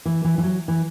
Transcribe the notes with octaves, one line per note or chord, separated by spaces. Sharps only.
E3
E3
E3
F#3
E3